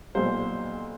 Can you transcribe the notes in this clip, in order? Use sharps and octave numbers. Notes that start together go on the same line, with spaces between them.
B1 A#2 G3 C5